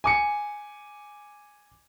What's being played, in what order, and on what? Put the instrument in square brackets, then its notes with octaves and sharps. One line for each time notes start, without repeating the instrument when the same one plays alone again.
[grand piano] G#5 D6 C#7